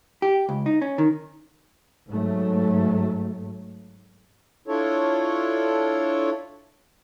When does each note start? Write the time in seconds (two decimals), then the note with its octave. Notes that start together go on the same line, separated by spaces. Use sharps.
0.22 G4
0.49 C#2
0.66 D#4
0.82 C#4
0.98 D#3
2.09 G#2 F#3 A3
4.68 D4 E4 F4 A4 C#5